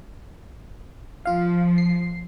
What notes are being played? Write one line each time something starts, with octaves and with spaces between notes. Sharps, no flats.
F3 F4 F5
C7